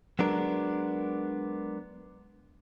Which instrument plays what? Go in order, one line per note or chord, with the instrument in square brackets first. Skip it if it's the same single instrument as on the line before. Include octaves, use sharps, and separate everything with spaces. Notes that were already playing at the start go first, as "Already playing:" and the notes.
[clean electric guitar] F#3 G#3 B3 D4 A#4